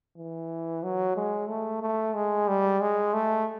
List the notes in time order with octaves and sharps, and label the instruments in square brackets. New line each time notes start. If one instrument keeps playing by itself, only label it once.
[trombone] E3
F#3
G#3
A3
A3
G#3
G3
G#3
A3